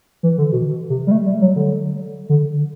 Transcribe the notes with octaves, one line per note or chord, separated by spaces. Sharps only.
E3
D3
B2
C3
G3
A3
G3
F#3
D3
D3